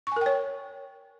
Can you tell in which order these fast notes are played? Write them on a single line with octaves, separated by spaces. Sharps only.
C#6 G#5 A#4 G5 C#5